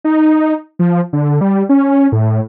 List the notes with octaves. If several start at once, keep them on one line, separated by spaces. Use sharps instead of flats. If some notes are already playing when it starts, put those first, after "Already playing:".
D#4
F3
D3
G3
C#4
A2